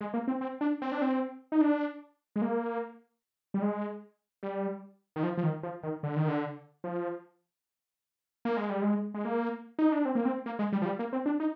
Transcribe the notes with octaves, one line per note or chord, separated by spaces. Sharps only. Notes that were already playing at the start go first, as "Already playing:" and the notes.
G#3
A#3
C4
C4
D4
C4
D4
C4
D#4
D4
G#3
A#3
G3
G#3
G3
D#3
F3
F3
D#3
F3
D#3
D3
D#3
D3
F3
A#3
G#3
G3
G#3
G#3
A#3
D#4
D4
C4
A#3
C4
A#3
G#3
G3
F3
G3
A#3
C4
D4
D#4